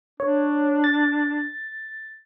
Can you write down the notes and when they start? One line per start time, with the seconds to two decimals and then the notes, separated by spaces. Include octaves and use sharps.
0.20 D4 C#5
0.84 A6